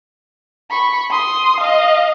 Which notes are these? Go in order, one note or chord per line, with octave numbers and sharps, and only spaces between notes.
B5 C#6
C6 D#6
D#5 F5